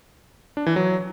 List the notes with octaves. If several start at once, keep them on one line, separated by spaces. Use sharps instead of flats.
D4
E3
F#3